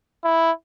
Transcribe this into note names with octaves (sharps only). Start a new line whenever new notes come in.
E4